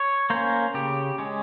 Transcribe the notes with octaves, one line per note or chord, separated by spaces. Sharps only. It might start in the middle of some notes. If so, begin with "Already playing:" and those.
Already playing: C#5
A#3 C#4 C5
C#3 G4
G#3 C#4